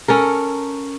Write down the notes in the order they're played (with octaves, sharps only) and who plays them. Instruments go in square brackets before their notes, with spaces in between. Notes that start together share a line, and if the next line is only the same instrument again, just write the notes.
[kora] C#4 A4 A#4